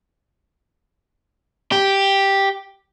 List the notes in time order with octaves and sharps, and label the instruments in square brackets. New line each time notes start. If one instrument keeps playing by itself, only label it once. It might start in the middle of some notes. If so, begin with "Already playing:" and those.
[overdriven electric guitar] G4